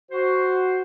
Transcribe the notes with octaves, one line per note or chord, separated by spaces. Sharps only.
F#4 C5